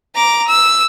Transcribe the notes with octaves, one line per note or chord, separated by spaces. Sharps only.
A#5 D6
E6